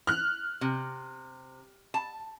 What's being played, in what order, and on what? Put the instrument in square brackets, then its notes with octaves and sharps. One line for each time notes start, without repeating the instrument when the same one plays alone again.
[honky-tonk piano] F6 F#6
[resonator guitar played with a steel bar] C3
A5